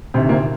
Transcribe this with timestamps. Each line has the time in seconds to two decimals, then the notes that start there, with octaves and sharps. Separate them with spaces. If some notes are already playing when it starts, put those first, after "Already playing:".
0.14 D2 C3 D#3 C4
0.29 A#2 A#3